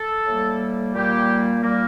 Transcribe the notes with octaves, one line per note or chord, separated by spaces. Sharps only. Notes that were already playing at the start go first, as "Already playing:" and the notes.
Already playing: A4
A2 G3 A#3
A#2 G3 A#3 G4
A#2 G3 A#3